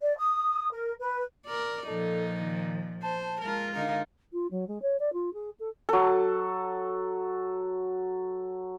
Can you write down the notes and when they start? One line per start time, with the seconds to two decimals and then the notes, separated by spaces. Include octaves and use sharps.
0.01 D5
0.18 D#6
0.71 A#4
0.99 B4
1.46 A#4 D5
1.87 A#2 F3 D#4 A4
2.41 D#3
3.03 C5 A5
3.41 G#3 F4 A#4
3.74 D3 D#4 A#4 F5
4.33 F4
4.51 F#3
4.68 G#3
4.82 C#5
5.00 D5
5.13 F4
5.34 G#4
5.60 A4
5.89 F#3 A4